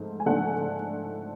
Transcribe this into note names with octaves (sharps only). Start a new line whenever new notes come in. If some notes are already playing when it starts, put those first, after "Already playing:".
Already playing: G#2 F3 A3
G#5
G#2 F3 A3 D4 F#5